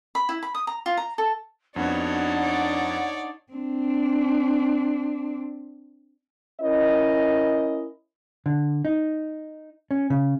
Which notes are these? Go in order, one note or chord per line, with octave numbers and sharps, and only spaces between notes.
B5
E4
B5
D#6
A#5
F4
A#5
A4
F2 B3 D4 D#4 F#4 C#5 F#5
C#5 D5
C4 D4
C#4 E4 A#4 D#5
D3
D#4
C#4
C#3